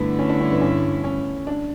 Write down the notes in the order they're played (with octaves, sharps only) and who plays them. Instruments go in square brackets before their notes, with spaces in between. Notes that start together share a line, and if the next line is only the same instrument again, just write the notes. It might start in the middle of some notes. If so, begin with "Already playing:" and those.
Already playing: [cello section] G2 D3 A3 E4 [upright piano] B3
[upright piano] C#4
D4
C#4
B3
C#4
C#4
D4